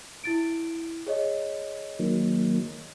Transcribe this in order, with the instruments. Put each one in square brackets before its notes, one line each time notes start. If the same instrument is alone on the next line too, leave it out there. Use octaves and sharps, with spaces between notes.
[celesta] E4 A6 D7
G#4 C#5 D#5
[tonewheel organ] D#3 F#3 A#3